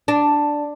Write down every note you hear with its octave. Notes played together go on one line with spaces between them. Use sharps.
D4